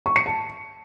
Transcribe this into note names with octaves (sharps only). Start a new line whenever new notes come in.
C#6
C#7
A5